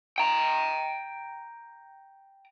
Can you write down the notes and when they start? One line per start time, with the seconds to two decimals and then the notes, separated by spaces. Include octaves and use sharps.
0.18 G5 A#5